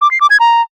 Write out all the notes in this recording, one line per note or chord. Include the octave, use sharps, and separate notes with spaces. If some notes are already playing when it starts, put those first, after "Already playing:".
D6
C7
D6
G#6
A#5